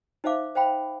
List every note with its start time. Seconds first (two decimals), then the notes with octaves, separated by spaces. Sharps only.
0.24 D#4 C5 E5 F5 D6
0.55 C5 F5 G5 B5